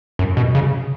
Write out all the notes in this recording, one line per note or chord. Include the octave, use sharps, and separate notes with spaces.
F#2
B2
C#3